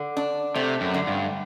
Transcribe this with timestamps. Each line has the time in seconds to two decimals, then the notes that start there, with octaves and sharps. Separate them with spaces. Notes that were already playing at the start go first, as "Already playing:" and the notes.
Already playing: D3
0.17 D4
0.55 C3 A3
0.81 F#2
0.94 D3
1.07 G2